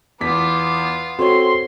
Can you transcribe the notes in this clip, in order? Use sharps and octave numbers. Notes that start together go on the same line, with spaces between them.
E2 B3 F4 D6 B6
C4 F#4 A4 C#5 C6